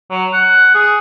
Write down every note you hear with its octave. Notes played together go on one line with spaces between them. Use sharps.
F#3
F#5
G#4